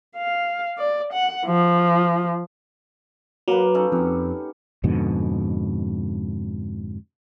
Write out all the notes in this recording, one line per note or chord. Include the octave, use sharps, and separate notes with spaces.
F5
D5
F#5
F3
F#3 A#3 A#4 B4
C#4 D#4 A4
F2 G4 F#5
F2 G#2 B2 D3